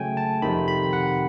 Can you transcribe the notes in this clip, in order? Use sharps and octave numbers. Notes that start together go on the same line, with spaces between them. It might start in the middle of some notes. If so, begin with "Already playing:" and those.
Already playing: C#3 F#3 A3 G5 G#5
A5
F2 C3 D#3 B5
B5
F#5